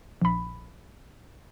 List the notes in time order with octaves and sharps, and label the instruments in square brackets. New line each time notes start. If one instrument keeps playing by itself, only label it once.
[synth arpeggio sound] A#1 B5